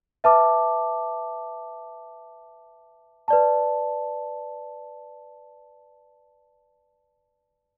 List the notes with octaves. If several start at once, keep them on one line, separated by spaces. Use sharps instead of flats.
B4 E5 A5 D6
B4 D5 A5